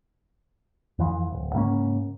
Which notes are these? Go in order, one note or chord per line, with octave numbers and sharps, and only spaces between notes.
F2 E3 F3
D1
G#2 C#3 A#3 C#4